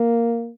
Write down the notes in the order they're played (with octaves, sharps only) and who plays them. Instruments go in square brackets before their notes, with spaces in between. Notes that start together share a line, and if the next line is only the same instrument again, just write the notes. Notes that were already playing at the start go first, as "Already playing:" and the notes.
Already playing: [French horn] A#3